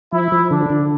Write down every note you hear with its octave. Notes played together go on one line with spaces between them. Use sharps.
F3 E4
F3
D3 D4
D3